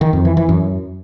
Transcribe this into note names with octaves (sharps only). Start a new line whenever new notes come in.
D#3
F2
E3
E3
F#2